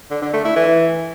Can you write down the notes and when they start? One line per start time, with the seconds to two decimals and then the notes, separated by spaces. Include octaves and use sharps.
0.11 D3
0.22 D3
0.33 A3
0.45 E4
0.56 E3